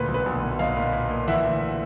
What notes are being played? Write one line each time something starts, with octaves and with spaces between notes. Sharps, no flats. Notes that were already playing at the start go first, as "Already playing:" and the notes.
Already playing: D2 A#2 B4
B1
B4
B1
A#2
B1 D#5 F5
A#2
A#2
A#2
E3 E5 F#5
D2